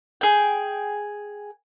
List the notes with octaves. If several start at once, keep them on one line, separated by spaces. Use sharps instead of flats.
G#4 G5